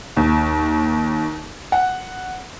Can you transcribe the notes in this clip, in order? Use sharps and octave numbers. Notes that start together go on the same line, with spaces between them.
D#2
F#5